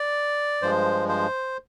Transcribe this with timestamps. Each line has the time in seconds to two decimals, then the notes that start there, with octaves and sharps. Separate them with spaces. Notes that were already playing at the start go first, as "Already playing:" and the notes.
Already playing: D5
0.62 G2 F3 G#3 C5
1.08 C5